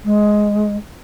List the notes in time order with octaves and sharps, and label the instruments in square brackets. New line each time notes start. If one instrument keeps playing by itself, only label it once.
[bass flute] G#3